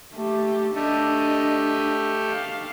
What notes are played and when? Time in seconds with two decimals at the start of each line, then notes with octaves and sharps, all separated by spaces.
0.13 A3 G4
0.75 A3 D4 G4 A4 D#5
2.31 F5